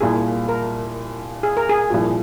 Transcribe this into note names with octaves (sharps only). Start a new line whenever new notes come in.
C2 A#2 A#3 G#4
A#4
G#4
A#4
G#4
C2 A#2 F3